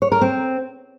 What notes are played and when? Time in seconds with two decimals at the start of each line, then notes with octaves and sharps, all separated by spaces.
0.02 C#5
0.12 A#4
0.21 C4